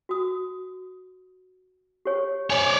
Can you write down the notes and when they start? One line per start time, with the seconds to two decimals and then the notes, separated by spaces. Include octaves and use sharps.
0.09 F#4 D#6
2.05 G4 C#5
2.50 C#5 D5 G#5